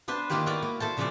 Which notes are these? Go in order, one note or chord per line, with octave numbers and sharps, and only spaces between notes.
B3 D4 B4 C5
D#3 A#3 E4 F4 G4 D5
B3 F#4 A#4 B4 D5
A#3
E4 A4 C5 A5
A#2 C#3 F3 A#4 B4 D5